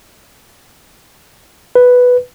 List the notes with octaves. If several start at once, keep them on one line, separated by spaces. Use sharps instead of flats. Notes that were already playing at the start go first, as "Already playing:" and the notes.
B4